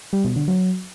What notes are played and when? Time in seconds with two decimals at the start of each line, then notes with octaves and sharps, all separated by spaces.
0.13 G3
0.24 B2
0.36 D3
0.48 F#3